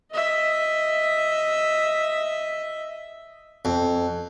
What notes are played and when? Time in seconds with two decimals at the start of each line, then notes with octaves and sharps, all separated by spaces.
0.11 D#5 E5
3.65 F2